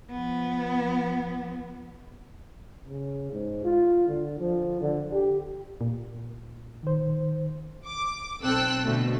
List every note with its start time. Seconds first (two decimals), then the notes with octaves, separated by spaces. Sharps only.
0.10 F3 B3
2.88 C#3
3.32 G#2
3.64 F4
4.07 D3
4.40 F3
4.81 D3
5.13 G4
5.81 A#2
6.83 D#3 C5
7.86 D6
8.42 B1 C4 A4 G5 E6 F#6
8.84 B2 D3 A3